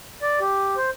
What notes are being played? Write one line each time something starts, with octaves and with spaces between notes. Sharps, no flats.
D5
G4
C5